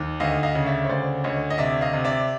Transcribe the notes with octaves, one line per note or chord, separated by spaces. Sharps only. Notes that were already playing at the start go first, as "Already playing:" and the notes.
Already playing: D#2
D2 D#5 F5
D#5 F5
C#3
D5 E5
C#5
D2 C5 D5
D2 C#5 D#5
D#5
C3 D5 E5
D#5 F5
C3
D5 E5